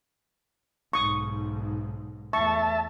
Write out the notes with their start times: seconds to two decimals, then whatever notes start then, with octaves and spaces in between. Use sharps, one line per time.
0.93 B1 G#2 C#6 D#6
2.33 E2 A3 E5 A5 C#6